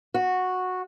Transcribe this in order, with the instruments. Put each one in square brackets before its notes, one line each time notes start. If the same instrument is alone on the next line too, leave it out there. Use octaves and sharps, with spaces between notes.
[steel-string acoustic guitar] F#4